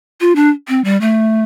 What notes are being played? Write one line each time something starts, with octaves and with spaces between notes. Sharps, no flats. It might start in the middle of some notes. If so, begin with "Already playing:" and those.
F4
D4
C4
G3
A3